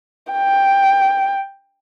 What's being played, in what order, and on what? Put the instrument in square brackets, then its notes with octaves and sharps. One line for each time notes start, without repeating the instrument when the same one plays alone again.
[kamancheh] G5